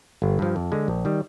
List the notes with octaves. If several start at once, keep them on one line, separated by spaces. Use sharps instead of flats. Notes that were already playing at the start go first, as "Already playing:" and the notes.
G1
G2 F3
F2
D3 G#3
A#1
D#3 G3